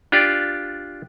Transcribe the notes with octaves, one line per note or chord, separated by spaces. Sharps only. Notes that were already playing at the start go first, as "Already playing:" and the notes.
D4 F4 G4 D5